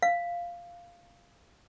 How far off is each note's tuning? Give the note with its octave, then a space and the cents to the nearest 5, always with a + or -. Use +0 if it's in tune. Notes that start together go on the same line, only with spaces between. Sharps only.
F5 -5